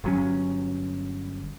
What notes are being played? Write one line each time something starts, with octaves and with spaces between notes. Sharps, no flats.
G1 F#3 C#4